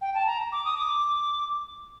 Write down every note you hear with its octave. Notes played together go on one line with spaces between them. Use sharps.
G5
A5
A#5
D6
D#6
D6